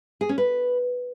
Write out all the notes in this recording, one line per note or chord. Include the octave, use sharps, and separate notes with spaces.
G#4
C#4
B4